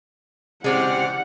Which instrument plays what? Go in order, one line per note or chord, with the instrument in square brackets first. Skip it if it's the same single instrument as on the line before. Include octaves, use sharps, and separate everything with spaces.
[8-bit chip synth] C#3 D5 F6 [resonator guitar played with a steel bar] G#3 C4 [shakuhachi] G4 [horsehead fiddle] F#5